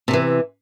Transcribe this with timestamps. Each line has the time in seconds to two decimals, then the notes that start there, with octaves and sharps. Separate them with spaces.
0.08 C3
0.11 F3
0.13 E3